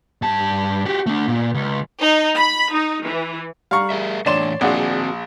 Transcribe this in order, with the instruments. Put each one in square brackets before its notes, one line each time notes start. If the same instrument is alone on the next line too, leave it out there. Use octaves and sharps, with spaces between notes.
[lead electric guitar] G2 A5
F#4 G4
A3 D4
A#2
C#2
[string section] D#4
B5
D#4
E3
[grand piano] G3 A#5 [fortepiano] F5 C#6
[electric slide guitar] G#4 A#4 E5
[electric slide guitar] A2 E3 D4 [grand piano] C#5 E7 [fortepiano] D5 C6
[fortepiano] A#1 [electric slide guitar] C4 F#4 [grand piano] G#4 D5 F#5